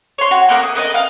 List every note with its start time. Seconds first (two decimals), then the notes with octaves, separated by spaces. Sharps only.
0.18 C#5 C6
0.31 F#4
0.49 A#3 B3 A#4
0.63 D#6
0.75 A#4 B4 C#5 D#5
0.94 F5